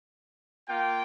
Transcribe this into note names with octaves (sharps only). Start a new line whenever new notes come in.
A#3 F4 G5